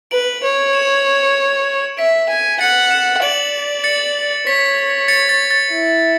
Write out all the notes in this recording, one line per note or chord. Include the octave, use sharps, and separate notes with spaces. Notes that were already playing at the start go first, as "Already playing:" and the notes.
B4 D7 F#7
C#5
C#7 E7
E5 B6 D7
G#5
F#5 A6 C#7
C#7 E7
D5 D7 F#7
A6 C#7
C#5 B6
A6 C#7
A6
A6
E4